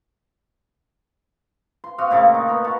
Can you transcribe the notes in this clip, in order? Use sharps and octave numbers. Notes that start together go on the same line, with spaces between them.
C6
C4 F#4 D#5 F5
A#2 C#3 A3 A#3
D#4
B3 A#5
B2 F#5 A5 C#6